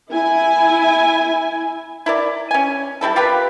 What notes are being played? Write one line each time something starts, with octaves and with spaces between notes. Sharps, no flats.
E4 G#5
E4 A#4 D5
C#4 G#5
G3 A#3 E4 A4
F4 G4 A#4 B4